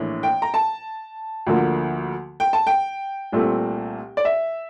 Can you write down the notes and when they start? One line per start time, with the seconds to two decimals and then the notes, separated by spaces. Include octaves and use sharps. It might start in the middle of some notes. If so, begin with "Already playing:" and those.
Already playing: A#1 A2 E3 A#3 D4
0.23 G5
0.42 A#5
0.54 A5
1.47 D2 D3 F3 A#3
2.40 G5
2.53 A5
2.67 G5
3.32 C2 A#2 A3 C4
4.17 D5
4.25 E5